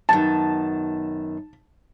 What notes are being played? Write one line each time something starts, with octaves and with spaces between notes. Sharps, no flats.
F#2 B2 D#3 A5